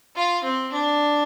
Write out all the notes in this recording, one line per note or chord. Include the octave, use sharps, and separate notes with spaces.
F4
C4
D4